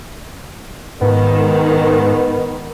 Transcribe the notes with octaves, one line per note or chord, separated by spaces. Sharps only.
G#2 D#3 B3